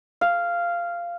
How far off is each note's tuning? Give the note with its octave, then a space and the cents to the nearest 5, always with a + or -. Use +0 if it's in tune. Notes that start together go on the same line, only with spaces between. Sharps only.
F5 -10